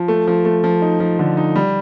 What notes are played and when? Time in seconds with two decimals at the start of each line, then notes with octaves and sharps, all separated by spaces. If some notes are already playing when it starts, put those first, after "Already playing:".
Already playing: F3
0.08 A3
0.27 F3
0.45 A3
0.64 F3
0.82 D#4
1.00 F3
1.19 D3
1.37 D#4
1.56 G3